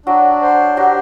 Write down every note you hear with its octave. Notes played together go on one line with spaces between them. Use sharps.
F#3 D4
C5
F#3 G4